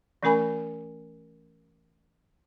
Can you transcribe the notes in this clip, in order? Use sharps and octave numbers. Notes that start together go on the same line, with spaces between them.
E3 A3 C#4 A#4 G#5 B5